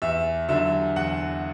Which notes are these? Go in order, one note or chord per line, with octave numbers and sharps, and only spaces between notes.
E2 E5
D3 F#3 E5
E2 F#5